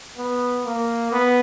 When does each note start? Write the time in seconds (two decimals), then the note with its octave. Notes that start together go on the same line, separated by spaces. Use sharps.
0.17 B3
0.65 A#3
1.12 B3